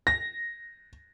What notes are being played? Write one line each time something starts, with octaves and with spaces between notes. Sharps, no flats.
A#6